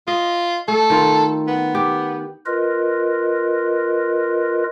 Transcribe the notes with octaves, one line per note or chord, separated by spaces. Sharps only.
F4 D#5
A3 A4
D#3 F4 F5
B3
G4
F4 A#4 B4 D#5